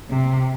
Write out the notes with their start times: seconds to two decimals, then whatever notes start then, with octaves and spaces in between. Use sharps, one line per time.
0.10 C3